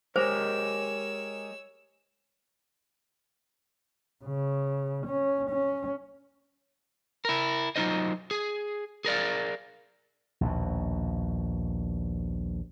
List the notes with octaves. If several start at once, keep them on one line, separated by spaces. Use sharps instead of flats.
G#3 G4 A#4 C5 C#5 E6
C#3
C#4
C#4
E4 A#4
F#3 C#4 D#4 F4 C5 D#5
G#4
G#4 A#4 D5 F5
A#1 D#2 B2